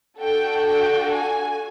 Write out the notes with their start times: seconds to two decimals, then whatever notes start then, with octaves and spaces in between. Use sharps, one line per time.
0.19 D4 F#4 A4 G5
0.65 G5
1.10 G#5